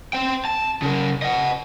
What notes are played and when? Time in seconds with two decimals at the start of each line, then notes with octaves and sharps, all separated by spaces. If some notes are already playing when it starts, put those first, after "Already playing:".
0.13 C5 G5
0.45 A5
0.82 C#3 A#4
1.22 D#5 F#5